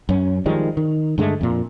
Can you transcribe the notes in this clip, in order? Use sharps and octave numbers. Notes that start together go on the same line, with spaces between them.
F#2 C#4
D#3 F3 G3 G#3
D#3
G2 D3 G#3 A3
F2 A#2